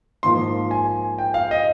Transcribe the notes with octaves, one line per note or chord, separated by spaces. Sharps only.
G#2 F3 A#3 C6
G#5
G5
F5
D#5